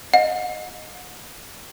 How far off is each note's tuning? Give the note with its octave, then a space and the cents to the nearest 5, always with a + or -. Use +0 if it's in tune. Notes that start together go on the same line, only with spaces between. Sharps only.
D#5 +0 F#5 -40